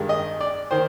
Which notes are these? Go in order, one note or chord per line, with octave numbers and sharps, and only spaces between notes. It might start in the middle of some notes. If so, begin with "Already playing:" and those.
Already playing: G2 D#3 G#3
D#5
D5
D#3 C5